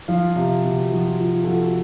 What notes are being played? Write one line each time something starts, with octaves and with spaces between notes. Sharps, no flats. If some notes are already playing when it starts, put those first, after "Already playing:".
F3 F5
C3 F5
C3 F#4
F3 F#4
F3 F4
A4
F3 F#4